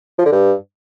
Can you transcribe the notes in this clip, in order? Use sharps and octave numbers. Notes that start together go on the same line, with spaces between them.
F3
D3
G2